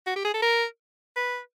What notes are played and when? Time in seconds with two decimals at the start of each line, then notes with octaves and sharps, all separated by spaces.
0.07 F#4
0.16 G4
0.24 G#4
0.34 A4
0.42 A#4
1.16 B4